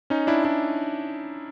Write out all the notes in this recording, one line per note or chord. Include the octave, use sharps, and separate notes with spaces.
C#4 D#4
D4 E4
D4 E4